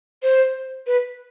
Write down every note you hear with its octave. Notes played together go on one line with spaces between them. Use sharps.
C5
B4